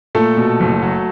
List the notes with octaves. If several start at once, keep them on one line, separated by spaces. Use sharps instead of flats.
A#2 A3 A4
B2
F#1
F#3